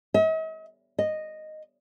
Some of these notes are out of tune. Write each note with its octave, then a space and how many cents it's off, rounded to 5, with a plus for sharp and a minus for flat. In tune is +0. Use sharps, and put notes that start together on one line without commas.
D#5 +45
D#5 -5